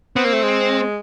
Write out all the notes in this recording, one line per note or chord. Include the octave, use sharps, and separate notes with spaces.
B3 C4
A#3
A3
G#3